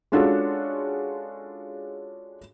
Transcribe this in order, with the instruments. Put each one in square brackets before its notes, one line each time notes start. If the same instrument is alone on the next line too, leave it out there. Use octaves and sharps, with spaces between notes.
[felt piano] G#3 C#4 D4 F4 F#4 A4